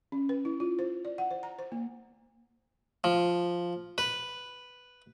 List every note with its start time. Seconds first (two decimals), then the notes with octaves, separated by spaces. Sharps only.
0.12 C#4
0.29 B4
0.45 E4
0.60 F4
0.79 C5
1.05 D5
1.18 F#5
1.31 C5
1.43 A#5
1.59 C5
1.72 A#3
3.04 F3
3.98 B4